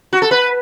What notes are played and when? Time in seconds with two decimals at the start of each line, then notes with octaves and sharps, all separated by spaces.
0.13 F#4
0.22 A4
0.31 B4